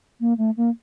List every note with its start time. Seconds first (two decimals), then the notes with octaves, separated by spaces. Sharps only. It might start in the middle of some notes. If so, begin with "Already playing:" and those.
0.20 A#3
0.38 A3
0.57 A#3